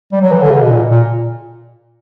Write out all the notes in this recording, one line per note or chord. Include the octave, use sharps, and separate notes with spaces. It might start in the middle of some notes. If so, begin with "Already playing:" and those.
G3
F#3
E3
D3
C#3
B2
A#2
A#2